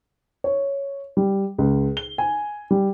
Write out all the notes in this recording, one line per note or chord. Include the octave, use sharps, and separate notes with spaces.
C#5
G3
C#2
G7
G#5
G3